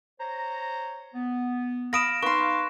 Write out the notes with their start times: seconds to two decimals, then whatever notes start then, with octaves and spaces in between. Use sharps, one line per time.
0.20 C5 C#5 A#5
1.14 B3
1.93 F5 B5 D#6 A#6 D7 E7
2.22 D#4 B4 F5 C6 C#6